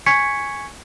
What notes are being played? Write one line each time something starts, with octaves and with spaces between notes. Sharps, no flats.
G#5 C#6 G#6 B6 C#7